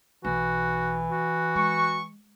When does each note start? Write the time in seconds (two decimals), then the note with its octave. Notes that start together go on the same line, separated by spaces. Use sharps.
0.25 B1 E3 F#4
1.12 F#4
1.56 G#3 C#6